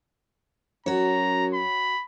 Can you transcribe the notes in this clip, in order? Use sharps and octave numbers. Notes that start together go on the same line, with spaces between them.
F#2 F#4 C#5 A#5
B5